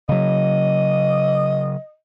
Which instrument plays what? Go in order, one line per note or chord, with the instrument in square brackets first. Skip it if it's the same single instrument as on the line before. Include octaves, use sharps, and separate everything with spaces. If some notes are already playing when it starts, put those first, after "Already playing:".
[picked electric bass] C#3 F#3 [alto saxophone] D#5